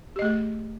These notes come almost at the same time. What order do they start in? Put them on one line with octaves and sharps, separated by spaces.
G4 D#5 A3 G#4